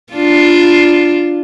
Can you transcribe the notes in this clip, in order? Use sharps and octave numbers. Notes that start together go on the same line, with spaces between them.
D4 F4